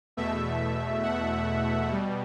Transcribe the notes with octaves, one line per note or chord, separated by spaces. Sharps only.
E2 B2 A3 E5
F#5
B2 G3